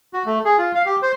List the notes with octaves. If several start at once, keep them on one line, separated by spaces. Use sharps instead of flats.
F#4
A3
G#4
F4
F5
G4
C5